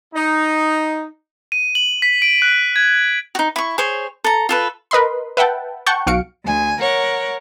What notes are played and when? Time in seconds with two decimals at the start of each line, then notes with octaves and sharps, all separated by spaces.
0.14 D#4
1.52 D#7
1.75 F#7
2.02 B6
2.22 D7
2.42 F#6
2.76 G#6
3.35 D#4 F#4
3.56 E4 C#6
3.78 G#4 C5 C#5
4.24 A4 A#5
4.49 F4 A4 B4
4.91 A#4 B4 D#5 B5 C6
5.37 B4 E5 F#5 G5 A5
5.86 F#5 G5 A5 C#6 G6
6.07 B1 F#4 F5 C#7 D7
6.44 D2 G#5
6.80 A#4 C#5 F#5